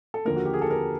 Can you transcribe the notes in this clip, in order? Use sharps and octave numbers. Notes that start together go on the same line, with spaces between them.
A4
D#2 D3 F3 A#3 A#4
F#4
G4
G#4
A4
A#4